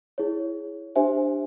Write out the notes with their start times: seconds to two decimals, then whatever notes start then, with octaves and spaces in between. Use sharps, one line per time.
0.18 E4 G#4 C#5
0.96 D4 G4 C5 E5 G#5